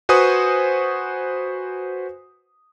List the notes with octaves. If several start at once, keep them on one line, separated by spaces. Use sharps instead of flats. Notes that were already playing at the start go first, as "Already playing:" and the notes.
F#4 B4 C5 G#5 C#6 D#6